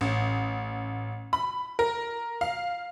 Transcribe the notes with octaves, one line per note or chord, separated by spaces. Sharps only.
A1
B5
A#4
F5